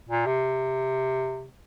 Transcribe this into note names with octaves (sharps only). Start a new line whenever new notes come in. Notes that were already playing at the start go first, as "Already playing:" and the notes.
A#2
C3